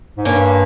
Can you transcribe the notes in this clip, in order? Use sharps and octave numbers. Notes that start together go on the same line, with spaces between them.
G#2
G2 A#3 C#4